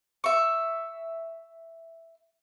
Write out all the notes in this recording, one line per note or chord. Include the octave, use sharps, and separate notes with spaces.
E5 C#6